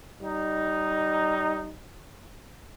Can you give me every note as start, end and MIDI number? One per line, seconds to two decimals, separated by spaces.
0.22 1.74 55
0.22 1.74 63